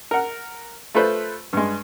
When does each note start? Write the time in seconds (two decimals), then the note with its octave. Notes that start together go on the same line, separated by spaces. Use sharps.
0.11 A#4 F#5
0.95 A3 F4 A4 B4 C5
1.53 G2 G#3